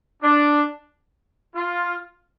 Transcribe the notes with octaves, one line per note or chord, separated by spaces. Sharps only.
D4
F4